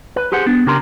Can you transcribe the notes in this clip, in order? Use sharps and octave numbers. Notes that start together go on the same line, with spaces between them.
B4
G4 G#4 C5 F#5
B3 D4
C#3 G4 A#4 C6